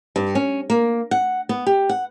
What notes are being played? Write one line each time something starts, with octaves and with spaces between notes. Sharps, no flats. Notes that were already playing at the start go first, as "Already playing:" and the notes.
G2
C#4
A#3
F#5
B3
G4
F#5